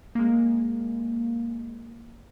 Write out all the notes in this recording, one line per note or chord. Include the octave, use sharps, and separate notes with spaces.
G#3 A#3